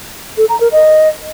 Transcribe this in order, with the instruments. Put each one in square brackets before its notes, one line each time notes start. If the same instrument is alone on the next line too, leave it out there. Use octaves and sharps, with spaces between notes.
[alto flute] A4
A#5
A#4
D#5